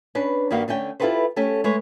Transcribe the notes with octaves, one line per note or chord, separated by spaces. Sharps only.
C#4 D4 B4
G2 D#3 G3 A#3 F#4 F5
D3 A3 C#4 G5
E4 F4 G4 A4 B4 C5
A3 C#4 G4 A4
G#3 A3 B4 C#5